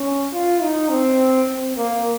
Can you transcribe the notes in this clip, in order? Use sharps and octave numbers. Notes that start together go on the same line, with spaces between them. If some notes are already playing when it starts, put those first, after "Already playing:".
Already playing: C#4
F4
D#4
C4
C4
A#3